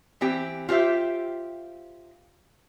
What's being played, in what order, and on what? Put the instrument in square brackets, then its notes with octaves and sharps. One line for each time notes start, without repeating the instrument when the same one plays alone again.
[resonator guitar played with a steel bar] E3 C4 G4
F4 G4 C5 E5